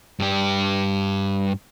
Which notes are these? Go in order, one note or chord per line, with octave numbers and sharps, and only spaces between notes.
G2 G4